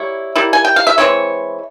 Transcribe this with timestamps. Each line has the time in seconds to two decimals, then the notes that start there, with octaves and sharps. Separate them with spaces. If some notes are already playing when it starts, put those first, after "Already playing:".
Already playing: G3 A#3 E4 C#5
0.36 G3 A#3 E4
0.53 G#5
0.65 G5
0.76 F5
0.87 E5
0.98 E3 G#3 C4 E4 C#5